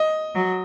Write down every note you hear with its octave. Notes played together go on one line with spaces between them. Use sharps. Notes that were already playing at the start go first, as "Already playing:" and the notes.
Already playing: D#5
F#3